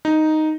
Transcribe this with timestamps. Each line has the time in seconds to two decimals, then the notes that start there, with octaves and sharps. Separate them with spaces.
0.05 D#4